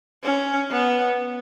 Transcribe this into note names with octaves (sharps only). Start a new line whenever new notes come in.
C#4
B3